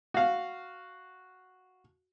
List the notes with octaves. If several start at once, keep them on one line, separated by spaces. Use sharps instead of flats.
F#4 F5